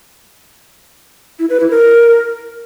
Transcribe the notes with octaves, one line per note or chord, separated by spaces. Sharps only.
E4
B4
E4
A#4